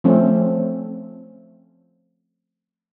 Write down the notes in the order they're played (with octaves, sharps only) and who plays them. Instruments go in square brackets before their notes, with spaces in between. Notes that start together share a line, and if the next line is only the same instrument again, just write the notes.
[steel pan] F3 A3 C4 C#4